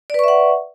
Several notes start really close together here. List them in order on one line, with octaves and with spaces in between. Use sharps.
D5 B4 C#6 E5 F#5